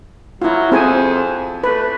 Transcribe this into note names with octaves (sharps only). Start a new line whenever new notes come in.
F#3 E4 F4
F2 C4 G#4 G#5
A3 B4